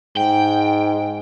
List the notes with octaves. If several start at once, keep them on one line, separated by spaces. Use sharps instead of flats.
G#2 G5